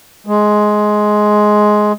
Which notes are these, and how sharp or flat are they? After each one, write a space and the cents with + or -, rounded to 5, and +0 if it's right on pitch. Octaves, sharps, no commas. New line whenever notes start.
G#3 +10